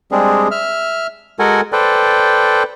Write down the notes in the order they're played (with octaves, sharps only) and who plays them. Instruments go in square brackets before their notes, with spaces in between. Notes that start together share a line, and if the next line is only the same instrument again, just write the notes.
[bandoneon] G3 G#3 C4 D4 G#4
E5 F6
G#3 F#4 A4 A#4 F#5 G#5
A4 B4 C5 D5 G5